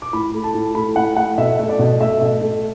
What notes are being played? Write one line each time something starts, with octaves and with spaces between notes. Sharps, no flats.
D6
A2 B5
A3
A5
A2
A3 B5
A2 F#5
A3 F#5
B2 E5
A3
D5
B2
A3 E5
B2
A3